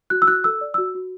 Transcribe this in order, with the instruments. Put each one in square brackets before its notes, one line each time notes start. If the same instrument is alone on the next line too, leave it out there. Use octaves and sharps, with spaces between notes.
[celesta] F#4 F#6
E6
F#4 F#6
A4 E6
D5
F#4 E6
F#4